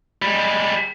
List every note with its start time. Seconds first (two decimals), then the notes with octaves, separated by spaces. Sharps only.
0.22 G3 G#3